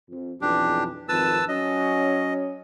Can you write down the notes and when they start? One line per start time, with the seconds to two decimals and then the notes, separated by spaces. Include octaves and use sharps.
0.10 F2
0.41 B1 F2 E3 D4 G4
1.09 G#1 F2 D#3 B4 A5 E6
1.48 F#3 C#4 D#5